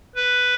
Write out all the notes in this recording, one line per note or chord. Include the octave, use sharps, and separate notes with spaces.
B4